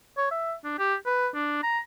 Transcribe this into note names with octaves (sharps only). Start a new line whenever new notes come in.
C#5
E5
D4
G4
B4
D4
A#5